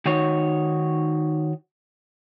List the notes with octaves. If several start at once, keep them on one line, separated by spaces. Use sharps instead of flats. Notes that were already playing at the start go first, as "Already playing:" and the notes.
D#3 D#4 F#4 C#5